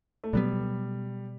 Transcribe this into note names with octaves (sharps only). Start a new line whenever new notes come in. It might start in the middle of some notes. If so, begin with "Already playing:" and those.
A3
B2 F#3 G3 B3